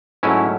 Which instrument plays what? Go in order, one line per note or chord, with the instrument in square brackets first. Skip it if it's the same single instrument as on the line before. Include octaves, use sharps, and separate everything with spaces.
[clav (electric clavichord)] G#2 F#3 A3 C#4 E4